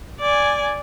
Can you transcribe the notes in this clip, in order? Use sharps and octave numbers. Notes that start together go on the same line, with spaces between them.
D5 G#5